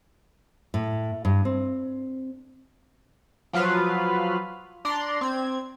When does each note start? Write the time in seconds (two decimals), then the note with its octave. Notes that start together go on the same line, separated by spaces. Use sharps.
0.74 A2
1.25 G2
1.45 C4
3.53 F3 F#3 F4 B4 F5
4.85 D4 D5 A#5 C6
5.21 C4 G#6